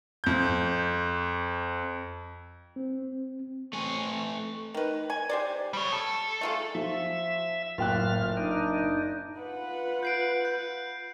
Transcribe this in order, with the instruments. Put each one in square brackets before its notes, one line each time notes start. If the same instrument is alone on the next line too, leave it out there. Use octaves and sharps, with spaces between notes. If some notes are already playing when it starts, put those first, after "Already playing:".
[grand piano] F2 G6
[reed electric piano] C4
[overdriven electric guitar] A3 G#5 [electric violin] C4 C#6
[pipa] D#3 B4
G#5
G4 C5 D5
[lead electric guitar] G3 C#5
A4
[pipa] A3 F4 G#4
[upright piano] F3 [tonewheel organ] E5
[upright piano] F#1 G5 F#6 [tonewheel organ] A2 F4 F6
[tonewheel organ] D4 D#4
[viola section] F4 B4 F#5
[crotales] G6 C7 D7
G6